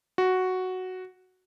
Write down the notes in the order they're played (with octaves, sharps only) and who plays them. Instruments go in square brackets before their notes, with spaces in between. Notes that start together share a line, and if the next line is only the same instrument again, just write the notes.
[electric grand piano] F#4